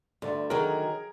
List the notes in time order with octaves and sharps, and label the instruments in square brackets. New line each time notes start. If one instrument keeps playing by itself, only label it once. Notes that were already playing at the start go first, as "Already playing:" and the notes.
[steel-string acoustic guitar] D2 [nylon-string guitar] D3 A3 D5
[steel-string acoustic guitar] D#3 F#3 [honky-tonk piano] G#4 A#5 [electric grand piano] A#4